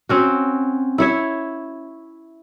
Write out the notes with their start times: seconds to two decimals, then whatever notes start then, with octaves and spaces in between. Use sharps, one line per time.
0.09 C4 C#4 F#4
0.98 E4 C#5 E5